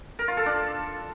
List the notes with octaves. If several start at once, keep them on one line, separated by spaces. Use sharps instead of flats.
A#4
F4
A4
D4